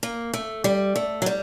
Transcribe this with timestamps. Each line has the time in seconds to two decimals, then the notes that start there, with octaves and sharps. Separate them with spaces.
0.03 A#3
0.33 A3
0.64 G3
0.96 A3
1.22 F#3
1.26 G3